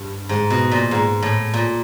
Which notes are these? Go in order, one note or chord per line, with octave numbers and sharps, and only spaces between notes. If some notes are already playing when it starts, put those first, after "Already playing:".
Already playing: G2
G#2
B2
A#2
G#2
A2
A#2